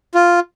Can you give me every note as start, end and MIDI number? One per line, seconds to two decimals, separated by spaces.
0.15 0.40 65